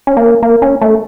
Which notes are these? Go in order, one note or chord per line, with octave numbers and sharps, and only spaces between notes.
C#4
A#3
A#3
C#4
A3